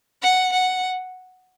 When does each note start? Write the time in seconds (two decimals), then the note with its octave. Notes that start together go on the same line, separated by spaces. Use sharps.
0.23 F#5
0.53 F#5